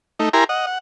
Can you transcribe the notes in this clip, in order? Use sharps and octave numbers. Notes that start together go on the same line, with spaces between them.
A3 D#4
E4 G4 A#4 G#5 A#5 C6
D#5 F#5
F#5